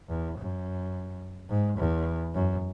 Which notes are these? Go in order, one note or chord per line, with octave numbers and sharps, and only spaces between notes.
E2
F#2
G#2
E2
F#2